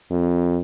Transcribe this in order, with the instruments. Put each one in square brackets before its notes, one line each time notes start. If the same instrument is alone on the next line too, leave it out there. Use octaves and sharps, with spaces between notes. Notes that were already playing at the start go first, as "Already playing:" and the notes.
[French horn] F2